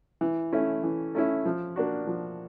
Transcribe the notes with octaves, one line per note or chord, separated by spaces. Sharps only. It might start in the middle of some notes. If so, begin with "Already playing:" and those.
E3
A3 C#4 E4
E3
A3 C#4 E4
F3
A#3 D4 F#4
F3